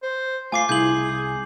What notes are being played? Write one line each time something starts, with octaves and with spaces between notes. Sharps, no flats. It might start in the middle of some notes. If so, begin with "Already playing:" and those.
C5
A3 F4 G#5 D6 C7
C2 E4 G#4 C6 G6 F#7